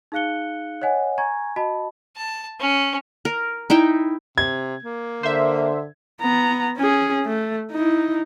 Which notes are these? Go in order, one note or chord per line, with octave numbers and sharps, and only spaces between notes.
D#4 G#4 F5 F#6 C#7 G7
C#5 D#5 F#5 G#5
G#5 A#5 C#6 G#6
F#4 D#5 A5 B5
A5
C#4
A#4
D#4 E4 E5 G5
C3 G#6
A#3
D3 C5 E5
B3 A#5
C#4 G#4
A3
D#4 E4